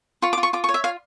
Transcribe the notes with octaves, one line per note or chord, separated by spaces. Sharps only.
F4 C#6
D6
F4
C#6
F4 D6
C#6
C#5
E5
F4 F5